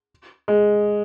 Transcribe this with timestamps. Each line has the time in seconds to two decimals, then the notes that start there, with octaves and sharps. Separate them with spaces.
0.48 G#3